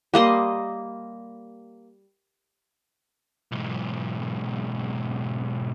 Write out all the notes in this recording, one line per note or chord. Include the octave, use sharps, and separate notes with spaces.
G3 A#3 D#5 C6
B1 G#2